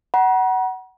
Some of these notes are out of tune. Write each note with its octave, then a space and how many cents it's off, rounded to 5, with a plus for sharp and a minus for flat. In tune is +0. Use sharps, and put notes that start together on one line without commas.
F#5 +20 A#5 +45